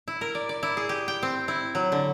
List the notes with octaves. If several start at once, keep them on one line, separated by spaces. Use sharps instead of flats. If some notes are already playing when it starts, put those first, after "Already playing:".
E4
A#4
D5
D5
E4
G#4
G4
G5
C4
E4
F#3
D3